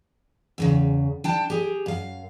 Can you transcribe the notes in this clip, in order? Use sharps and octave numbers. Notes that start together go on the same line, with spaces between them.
E2 A2 C#3
D4 G5 A5
G4 G#4
F#2 F5